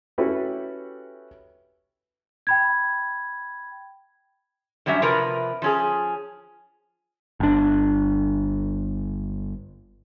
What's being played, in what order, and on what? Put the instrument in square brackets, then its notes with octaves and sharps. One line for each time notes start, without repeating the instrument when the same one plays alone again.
[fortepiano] C#4 E4 F#4 G4 A4 B4
[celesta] G5 B5 G#6
[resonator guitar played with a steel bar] F#2 F#3 G3 C#4 E5
C3 F3 A#4 B4
F3 C#4 G#4
[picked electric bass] G1 D4